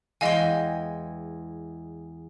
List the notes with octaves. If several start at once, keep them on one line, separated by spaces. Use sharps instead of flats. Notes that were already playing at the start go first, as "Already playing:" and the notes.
E2 G#3 D#5 F5 G5 G#5